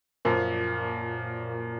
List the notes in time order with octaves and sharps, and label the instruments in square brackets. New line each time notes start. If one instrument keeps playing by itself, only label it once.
[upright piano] F#2 F3 A#3 [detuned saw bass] A#2